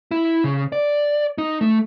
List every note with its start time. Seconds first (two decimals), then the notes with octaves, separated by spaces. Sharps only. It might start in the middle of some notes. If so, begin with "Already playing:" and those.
0.11 E4
0.44 C#3
0.72 D5
1.38 D#4
1.61 A3